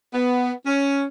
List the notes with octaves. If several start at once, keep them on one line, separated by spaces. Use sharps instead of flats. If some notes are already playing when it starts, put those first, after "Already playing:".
B3
C#4